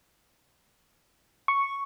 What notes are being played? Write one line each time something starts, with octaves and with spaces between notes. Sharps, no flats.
C#6